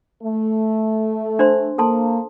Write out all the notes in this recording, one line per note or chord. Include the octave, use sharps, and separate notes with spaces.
A3
D4 C5 C6
A#3 A4 A5 C6